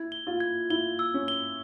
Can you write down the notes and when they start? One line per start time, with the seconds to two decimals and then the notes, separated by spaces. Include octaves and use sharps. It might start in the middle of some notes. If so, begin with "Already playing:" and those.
Already playing: E4 G#6
0.12 G7
0.27 F4
0.40 G#6
0.70 E4 G7
0.99 E6
1.14 C#4
1.28 G7